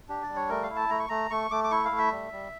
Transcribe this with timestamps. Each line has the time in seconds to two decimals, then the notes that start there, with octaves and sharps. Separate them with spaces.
0.09 D4 G4
0.22 D5
0.29 G3
0.36 C#5
0.49 A3 A#4
0.63 F5
0.70 E4
0.76 A5
0.90 A3 A#5
0.99 C#6
1.09 A3 A#5
1.31 A3 C#6
1.51 A3 D6
1.64 D6
1.71 E4 C#6
1.85 F5
1.91 A3
1.98 E5
2.12 G3
2.32 G3